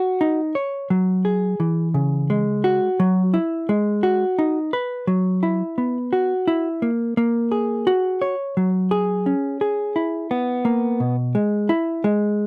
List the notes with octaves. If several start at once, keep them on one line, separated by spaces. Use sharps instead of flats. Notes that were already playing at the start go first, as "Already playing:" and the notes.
Already playing: F#4
D#4
C#5
F#3
G#4
E3
C#3
G#3
F#4
F#3
E4
G#3
F#4
D#4
B4
F#3
E4
B3
F#4
E4
A#3
A#3
G#4
F#4
C#5
F#3
G#4
C#4
G#4
E4
B3
A#3
B2
G#3
E4
G#3